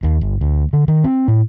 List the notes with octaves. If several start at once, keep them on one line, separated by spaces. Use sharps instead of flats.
D#2
G1
D2
D3
D#3
C4
A2